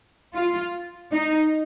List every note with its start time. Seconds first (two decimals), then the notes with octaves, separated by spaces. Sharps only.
0.34 F4
1.11 D#4